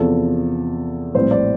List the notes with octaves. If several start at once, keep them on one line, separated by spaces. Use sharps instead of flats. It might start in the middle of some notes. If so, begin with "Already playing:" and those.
Already playing: E2 C3 F3 C4 A4
A#1 A2 G3 C4 C5
D5